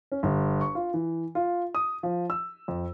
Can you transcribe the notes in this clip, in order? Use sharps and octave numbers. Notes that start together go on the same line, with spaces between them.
C#4
G1
C#6
F4
E3
F4
D#6
F3
E6
F2